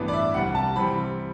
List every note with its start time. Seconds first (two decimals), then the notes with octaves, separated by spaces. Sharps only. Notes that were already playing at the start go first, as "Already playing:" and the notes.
Already playing: A1 G2 E3 B3 D4
0.08 D5
0.13 E5
0.34 C2 C3 G3 F#5
0.55 A5
0.76 C3 E3 G3 C4 B5